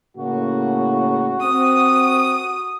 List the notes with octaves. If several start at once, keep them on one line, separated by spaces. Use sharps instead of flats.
A2 C#3 A#3 F#4
C4 D#6